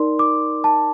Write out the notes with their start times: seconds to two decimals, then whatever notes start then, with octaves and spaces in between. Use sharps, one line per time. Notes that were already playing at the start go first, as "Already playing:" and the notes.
Already playing: D#4 A#4 D5 C6
0.19 D6
0.64 A5